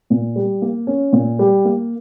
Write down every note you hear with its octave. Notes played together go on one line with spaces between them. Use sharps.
A#2
G3
A#3
C#4
A#2
G3
A#3